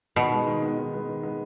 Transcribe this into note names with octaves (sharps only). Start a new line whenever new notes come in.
B2 D#3
G#3 B3
D#3
G#3 B3
D#3
G#3 B3
D#3
G#3 B3